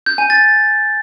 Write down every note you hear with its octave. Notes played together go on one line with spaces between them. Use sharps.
G6
G#5
A6